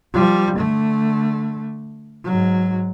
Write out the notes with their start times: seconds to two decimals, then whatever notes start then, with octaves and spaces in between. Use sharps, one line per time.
0.13 F3 G3
0.57 D3 A3
2.24 G#2 F#3